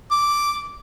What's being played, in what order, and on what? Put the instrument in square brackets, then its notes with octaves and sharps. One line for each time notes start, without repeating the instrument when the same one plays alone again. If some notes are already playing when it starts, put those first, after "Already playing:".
[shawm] D6